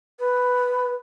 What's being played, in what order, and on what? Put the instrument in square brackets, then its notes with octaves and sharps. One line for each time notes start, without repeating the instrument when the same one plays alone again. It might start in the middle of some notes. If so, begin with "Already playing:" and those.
[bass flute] B4